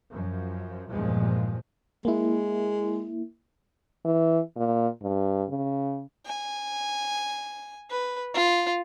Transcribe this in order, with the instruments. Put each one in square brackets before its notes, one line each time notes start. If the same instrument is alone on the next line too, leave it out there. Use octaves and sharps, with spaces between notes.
[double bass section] F#2 F3
E2 G2 A#2 F3 G#3
[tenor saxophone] G#3 [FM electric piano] A#3 E4
[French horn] E3
A#2
G2
C#3
[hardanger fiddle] G#5
B4
F4